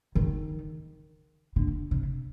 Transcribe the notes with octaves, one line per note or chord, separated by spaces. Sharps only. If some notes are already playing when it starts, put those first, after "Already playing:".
D#3
D3
C3